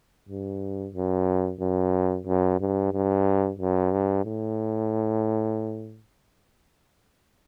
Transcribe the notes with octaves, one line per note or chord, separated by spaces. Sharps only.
G2
F#2
F#2
F#2
G2
G2
F#2
G2
A2